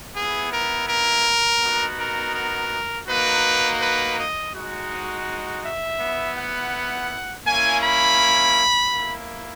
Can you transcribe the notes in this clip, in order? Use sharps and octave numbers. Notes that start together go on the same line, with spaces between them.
B3 E4 G#4
A#4
A#4
B3 D#4 F#4
A#4
A#4
A#3 D#4 F#4 B4
B4
D#5
G#3 D#4 F#4
E5
B3 E4
F#5
A#3 C#4 E4 G#5
B5
A#3 E4